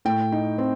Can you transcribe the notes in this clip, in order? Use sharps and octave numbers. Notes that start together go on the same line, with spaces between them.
A2 G5
D#4
C4